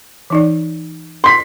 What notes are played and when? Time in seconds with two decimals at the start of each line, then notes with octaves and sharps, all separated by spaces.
0.30 E3 D#4 D5
1.24 C6 B6